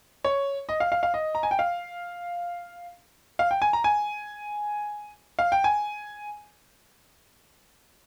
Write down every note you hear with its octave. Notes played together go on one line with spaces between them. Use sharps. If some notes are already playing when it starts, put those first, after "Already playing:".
C#5
D#5
F5
F5
F5
D#5
A#5
G#5
G5
F5
F5
G5
G#5
A#5
G#5
F5
G5
G#5